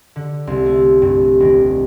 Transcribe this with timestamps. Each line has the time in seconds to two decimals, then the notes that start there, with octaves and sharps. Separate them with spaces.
0.16 D3
0.47 C2
0.66 A3
1.02 G2
1.40 D#1